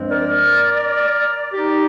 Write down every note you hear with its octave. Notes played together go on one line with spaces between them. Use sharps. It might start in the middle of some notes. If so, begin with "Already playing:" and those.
Already playing: G2 F3 G#3 C4
A#4 D5
D#4 G4